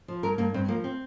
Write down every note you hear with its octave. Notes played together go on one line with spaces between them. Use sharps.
F3
G2 A#4
G2 A#3
G2 C4
F3 A#3
C4